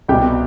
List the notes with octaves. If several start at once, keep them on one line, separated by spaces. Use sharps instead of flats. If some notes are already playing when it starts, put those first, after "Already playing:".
C2 B2 G3 G4 G5